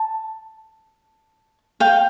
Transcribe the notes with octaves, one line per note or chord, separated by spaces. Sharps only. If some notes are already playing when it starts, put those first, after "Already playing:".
Already playing: A5
F5 G5